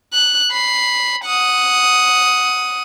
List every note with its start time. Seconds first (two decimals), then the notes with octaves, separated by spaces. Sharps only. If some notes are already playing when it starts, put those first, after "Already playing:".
0.13 F#6
0.51 B5 C7
1.25 F#5 D#6